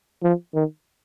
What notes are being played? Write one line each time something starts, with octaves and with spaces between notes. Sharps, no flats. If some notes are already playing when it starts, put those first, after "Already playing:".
F3
D#3